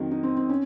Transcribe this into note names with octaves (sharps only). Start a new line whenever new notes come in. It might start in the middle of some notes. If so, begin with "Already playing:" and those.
Already playing: F2 D#3 F#3
D#4
C4
C4
C#4